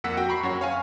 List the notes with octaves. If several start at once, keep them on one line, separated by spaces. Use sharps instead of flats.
F2 A#3 F#5 E6 B6
F#4 G5
A#5 B5 C#6 C7
F#2 F#4 C#5
C#5 F5 G#5 C#6